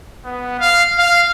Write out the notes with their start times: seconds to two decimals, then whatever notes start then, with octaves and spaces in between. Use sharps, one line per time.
0.24 B3
0.60 F5
0.98 F5